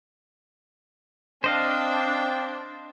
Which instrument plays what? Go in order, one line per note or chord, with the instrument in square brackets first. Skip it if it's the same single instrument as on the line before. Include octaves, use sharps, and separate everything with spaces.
[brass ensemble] C4 G5 [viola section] D4 [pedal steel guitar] C5 D#5 F5